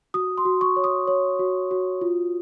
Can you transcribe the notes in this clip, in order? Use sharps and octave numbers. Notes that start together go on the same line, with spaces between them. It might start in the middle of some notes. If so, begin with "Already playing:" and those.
F#4 D#6
C6
F#4
C#6
C#5
D#6
C#5
F#4
F#4
F4